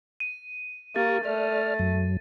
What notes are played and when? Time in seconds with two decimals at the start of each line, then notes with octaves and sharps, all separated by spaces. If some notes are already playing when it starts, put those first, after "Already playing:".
0.20 D#7
0.96 A#3 G4 C#6 A6
1.25 A3 D5 F6
1.79 F#2 F#3